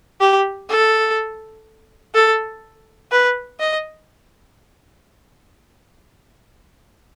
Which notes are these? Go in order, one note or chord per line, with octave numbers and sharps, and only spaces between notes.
G4
A4
A4
B4
D#5